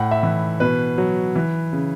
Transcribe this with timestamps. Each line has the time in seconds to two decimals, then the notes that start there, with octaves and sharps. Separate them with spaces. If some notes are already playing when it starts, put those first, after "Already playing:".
Already playing: A2 F#5
0.11 E5
0.23 E3
0.60 B2 B4
0.98 F#3
1.36 E3
1.73 C#3